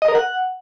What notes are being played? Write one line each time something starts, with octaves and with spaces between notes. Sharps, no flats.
D#5
A#4
F#5